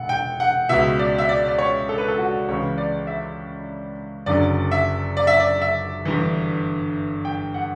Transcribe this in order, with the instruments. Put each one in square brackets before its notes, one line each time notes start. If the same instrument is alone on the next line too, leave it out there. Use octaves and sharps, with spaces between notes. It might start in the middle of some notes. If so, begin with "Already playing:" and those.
Already playing: [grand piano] E1 F#5
G5
F#5
C#2 B2 E5
D5
E5
D5
D5
C#5
A4
B4
A4
F#4
C#2 C#3 E3 C#5
D5
E5
F#1 F#2 D3 D5
E5
D5
E5
D5
E5
G1 G2 E3
G5
F#5